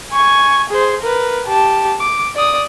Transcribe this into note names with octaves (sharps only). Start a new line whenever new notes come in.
G#5 C#6
G#4 C5
A#4 B4
G4 A5
D6
D5 D#6